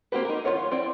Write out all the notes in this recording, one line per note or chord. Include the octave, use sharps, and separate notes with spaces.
A#3 C4 F#4 G4 B4
D#4 A#4
D#3 F#3 F4 C#5 F#5
F4
C4 E4 D5